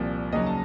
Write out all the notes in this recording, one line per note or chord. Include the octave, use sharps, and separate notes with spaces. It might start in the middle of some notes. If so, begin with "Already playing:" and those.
Already playing: C2 A#2 F3
D#2 C#3 F#3 D#5
A5